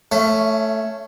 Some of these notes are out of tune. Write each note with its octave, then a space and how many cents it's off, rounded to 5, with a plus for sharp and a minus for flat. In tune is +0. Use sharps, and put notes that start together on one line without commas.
A3 +0 C#4 +0 E5 +35